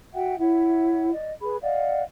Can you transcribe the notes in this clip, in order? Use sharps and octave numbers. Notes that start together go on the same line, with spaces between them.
F#4 E5 F#5 G5
E4 C#5 E5 F#5
D5 D#5
G#4 B4 B5
D5 D#5 F5 F#5